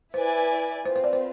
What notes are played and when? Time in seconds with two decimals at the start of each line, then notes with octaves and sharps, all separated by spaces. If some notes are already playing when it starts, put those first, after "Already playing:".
0.13 E4 B4 C5 D5 G#5
0.85 C4 F4 B4 C5
0.96 C5
1.04 D5
1.13 C5